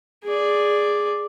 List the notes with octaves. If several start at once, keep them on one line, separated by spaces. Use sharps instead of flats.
G#4 D5